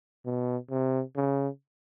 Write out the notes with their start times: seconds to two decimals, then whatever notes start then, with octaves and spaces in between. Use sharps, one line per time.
0.25 B2
0.70 C3
1.16 C#3